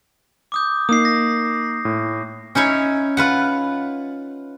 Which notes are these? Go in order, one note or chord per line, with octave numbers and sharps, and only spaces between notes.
D6 D#6 G6
A#3 D#4 D#6 C7
A#6
A2
C#4 D#4 E4 C#5
F4 B4 F#5